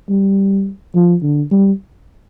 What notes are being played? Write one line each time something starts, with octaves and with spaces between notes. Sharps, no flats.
G3
F3
D3
G3